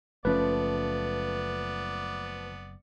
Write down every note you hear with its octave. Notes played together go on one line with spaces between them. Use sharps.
F#1 F3 A3 B3 C#4 B4 D5